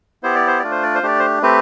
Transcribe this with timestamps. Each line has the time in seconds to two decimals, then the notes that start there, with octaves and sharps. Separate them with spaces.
0.23 B3 E4 G4 C5
0.35 D5
0.47 C5
0.59 A3 D4 F4 D5
0.71 C5
0.83 D5
0.95 C5
1.03 A3 D4 G4 D5
1.19 C5
1.42 A3 C4 G4 B4